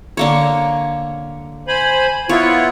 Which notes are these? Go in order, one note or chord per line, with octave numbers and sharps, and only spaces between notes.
D3 A#3 C#5
C5 G#5 B5
B3 E4 F4 C#5